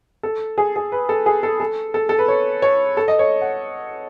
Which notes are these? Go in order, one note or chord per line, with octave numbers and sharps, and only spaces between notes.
A4
G#4
G#4
B4
A4
G#4
A4
A4
A4
A4
B4
C#5
C#5
A4
D#5
C#5
F#5